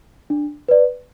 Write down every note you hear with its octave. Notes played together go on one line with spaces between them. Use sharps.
D4
B4 D5